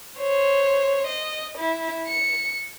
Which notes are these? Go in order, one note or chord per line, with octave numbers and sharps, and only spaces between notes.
C5 C#5
D#5
E4
C#7